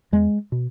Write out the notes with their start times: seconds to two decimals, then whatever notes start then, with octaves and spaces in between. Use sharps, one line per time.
0.12 E2 G#3
0.52 B2